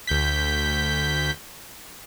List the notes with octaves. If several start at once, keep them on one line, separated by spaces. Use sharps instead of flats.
D2 G6 B6